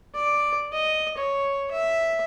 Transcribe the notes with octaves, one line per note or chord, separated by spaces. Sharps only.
D5
D#5
C#5
E5